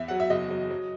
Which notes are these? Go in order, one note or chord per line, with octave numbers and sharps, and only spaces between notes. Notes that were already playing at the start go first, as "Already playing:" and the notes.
Already playing: E2 E5
F#3 F#5
E5
F#1 D#5
F#3
F#3